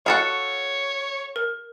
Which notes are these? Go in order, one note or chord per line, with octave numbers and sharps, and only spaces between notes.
F#4 A4 C#5 F5
A#4